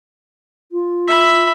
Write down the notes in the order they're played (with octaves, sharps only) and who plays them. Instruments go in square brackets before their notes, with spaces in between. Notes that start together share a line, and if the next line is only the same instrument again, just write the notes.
[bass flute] F4
[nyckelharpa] E5 B5